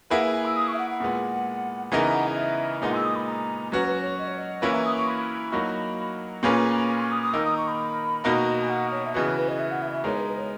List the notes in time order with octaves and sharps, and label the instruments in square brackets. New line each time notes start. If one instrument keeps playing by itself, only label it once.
[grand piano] A#3 E4 G#4 B4 [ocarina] F#5
[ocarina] G#5
G#5
E6
D#6
C#6
E5
F#5
F#5
[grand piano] A#2 G#3 B3
[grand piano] C#3 E3 B3 D#4 A#4 [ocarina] E5
[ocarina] F#5
D#5
E5
[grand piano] A#2 G#3 B3 D#4 [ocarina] F#5
[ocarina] E6
D#6
B5
A#5
[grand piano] F#3 C#4 F#4 [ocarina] B4
[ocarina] B4
C#5
D#5
C#5
D#5
[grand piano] E3 A#3 C#4 E4 B4 [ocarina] E5
[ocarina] A#5
D#6
C#6
B5
[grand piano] F#3 A#3 D#4 F#4
[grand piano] A#2 A#3 C#4 G#4 B4 [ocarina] A#5
[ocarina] B5
C#6
D#6
D#6
[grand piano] D#3 A#3 D#4 A#4 [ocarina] E6
[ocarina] D#6
C#6
B5
[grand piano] B2 A#3 D#4 F#4 A#4
[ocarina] G#5
F#5
C#5
E5
[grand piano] C#3 E3 B3 F#4 [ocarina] D#5
[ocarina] B4
D#5
E5
F#5
E5
D#5
E5
[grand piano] G#3 B3 D#4 A#4 [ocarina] C#5
[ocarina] B4
B4
C#5